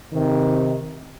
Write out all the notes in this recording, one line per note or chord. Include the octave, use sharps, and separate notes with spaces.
C3 D#3